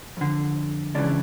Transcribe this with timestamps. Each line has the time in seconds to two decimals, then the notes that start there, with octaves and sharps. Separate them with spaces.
0.17 F2 D3
0.95 C#2 C#3 E3 D4